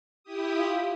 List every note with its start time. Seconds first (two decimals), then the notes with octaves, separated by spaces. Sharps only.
0.23 E4 G4 D#6
0.57 F4